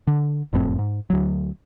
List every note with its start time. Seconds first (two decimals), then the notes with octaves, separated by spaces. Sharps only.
0.07 D3
0.53 F#1 F2 A2 C4
0.79 G#2
1.10 D2 F#3